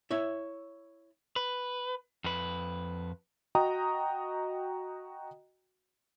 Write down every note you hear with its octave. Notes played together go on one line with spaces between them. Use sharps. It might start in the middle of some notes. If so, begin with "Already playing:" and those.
E4 C#5 E5
B4
F2 B4
F#4 D#5 G5 A#5 D#6